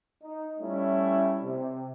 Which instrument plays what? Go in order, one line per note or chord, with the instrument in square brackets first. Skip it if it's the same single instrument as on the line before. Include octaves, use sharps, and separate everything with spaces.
[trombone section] D#4
G3 A3 C#4 E4
C3